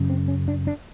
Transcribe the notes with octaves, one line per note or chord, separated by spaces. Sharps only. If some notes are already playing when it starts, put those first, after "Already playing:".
Already playing: F#2 C#3
C4
C#4
D4
D4